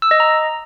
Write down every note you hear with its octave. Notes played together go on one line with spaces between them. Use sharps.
E6
D#5
A#5